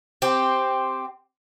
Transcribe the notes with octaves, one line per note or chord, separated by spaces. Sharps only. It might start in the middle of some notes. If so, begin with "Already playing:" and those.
C4 G4